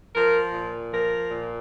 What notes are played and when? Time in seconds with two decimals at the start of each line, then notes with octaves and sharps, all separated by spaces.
0.13 F3 A#4
0.53 A#2
0.92 F3 A#4
1.31 A#2